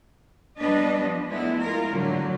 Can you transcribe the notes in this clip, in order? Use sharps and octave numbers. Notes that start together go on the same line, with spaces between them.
G3 B3 D4 B4 D#5
F3
G#3 A3 B3 E4
F4 A#4
A2 D3 F#3